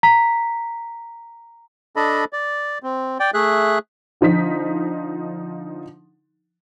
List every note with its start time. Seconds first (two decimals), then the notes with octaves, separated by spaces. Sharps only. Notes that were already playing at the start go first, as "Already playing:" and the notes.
0.03 A#5 B6
1.96 D4 A4 D#5 B5
2.33 D5
2.83 C4
3.20 D5 G5
3.34 A3 G#4 E5 F#6
4.21 D3 F3 D#4 B6